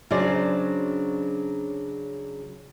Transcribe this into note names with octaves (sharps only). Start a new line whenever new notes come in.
C#3 F#3 D4 C5 D5